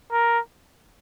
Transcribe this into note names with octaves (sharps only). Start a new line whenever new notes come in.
A#4